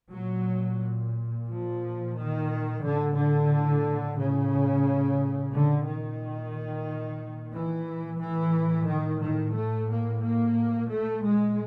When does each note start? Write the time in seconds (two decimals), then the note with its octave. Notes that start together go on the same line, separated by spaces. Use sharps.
0.13 A#2 F#3
1.48 F3
2.15 D#3
2.82 A2 D3
3.15 D3
4.17 C#3
5.51 A#2 D3
5.85 D#3
7.52 E3
8.20 A2 E3
8.87 D#3
9.21 D#3
9.54 A3
9.88 A#3
10.22 A#3
10.88 A#2 A3
11.23 G#3